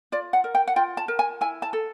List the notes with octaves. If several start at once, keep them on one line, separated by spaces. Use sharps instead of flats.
F4 D5
F#5
A#4
G5
F#5
F4 G5
A5
A#4
G#5
E4 G#5
A5
A4